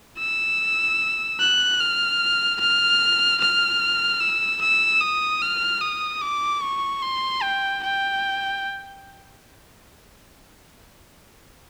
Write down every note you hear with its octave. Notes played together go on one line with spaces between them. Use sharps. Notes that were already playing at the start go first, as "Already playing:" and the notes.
E6
F#6
F6
F6
F6
E6
E6
D#6
F6
D#6
D6
C#6
C6
G5
G5